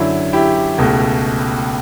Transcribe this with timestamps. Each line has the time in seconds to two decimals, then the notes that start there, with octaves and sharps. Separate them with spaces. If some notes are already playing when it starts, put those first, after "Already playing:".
Already playing: F#2 D3 F#3 E4
0.33 E4 G4
0.78 C#2 B2 A3